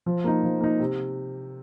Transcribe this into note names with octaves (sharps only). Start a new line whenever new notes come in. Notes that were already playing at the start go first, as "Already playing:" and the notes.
F3
A#3 D#4
F3
A#3 D#4
C3